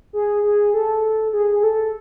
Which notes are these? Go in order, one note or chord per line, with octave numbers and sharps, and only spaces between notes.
G#4
G#4
A4
G#4
G#4
A4